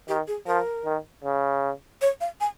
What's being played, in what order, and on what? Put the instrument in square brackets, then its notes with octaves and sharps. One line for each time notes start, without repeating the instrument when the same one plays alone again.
[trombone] D#3 [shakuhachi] G4
[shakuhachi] G#4
[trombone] F3 [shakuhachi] A#4
[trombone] D#3
C#3
[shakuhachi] C#5
F5
G#5